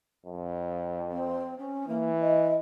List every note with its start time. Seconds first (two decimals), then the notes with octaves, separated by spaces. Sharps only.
0.26 F2
1.11 C4
1.58 C#4
1.88 E3 A#3
2.21 D#5